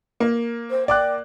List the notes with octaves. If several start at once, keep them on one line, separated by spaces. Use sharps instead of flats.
A#3
C5
D5 G5 D6 F#6